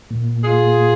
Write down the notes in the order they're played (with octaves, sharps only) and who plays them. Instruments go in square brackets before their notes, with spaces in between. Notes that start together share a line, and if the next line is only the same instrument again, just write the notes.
[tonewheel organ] A#2
[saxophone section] F4 G#4